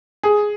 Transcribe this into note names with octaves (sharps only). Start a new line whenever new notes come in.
G#4